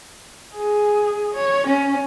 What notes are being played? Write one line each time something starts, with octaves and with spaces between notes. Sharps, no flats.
G#4
C#5
C#4